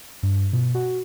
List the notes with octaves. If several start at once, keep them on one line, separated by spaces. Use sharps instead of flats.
G2
B2
F#4